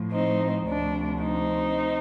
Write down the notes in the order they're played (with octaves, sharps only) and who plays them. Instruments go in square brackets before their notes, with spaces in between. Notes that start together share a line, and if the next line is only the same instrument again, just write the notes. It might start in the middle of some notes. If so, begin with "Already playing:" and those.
Already playing: [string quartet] A2 F3
C4 D#4
D2 C3 F3 D4
C4 D#4